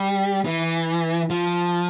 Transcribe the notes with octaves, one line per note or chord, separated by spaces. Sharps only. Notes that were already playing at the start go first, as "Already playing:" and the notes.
Already playing: G3
E3
F3